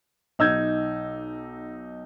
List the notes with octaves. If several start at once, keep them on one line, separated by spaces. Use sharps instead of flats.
B1 D#4 E6 G6 G#6